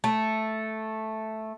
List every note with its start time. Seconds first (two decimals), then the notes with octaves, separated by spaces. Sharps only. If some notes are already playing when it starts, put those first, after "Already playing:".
0.04 A3